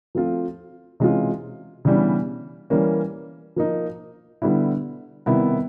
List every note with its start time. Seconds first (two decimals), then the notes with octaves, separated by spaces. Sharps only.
0.15 F3 A3 C4 F4
1.00 C3 E3 G#3 C#4 F4
1.85 C#3 E3 G3 B3 D4
2.70 E3 G3 A#3 C#4
3.56 F3 A#3 D#4
4.42 D3 G3 B3 E4
5.26 C3 D#3 G3 B3 E4